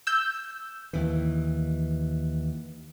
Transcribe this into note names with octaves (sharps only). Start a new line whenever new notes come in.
E6 G6
D#2 E3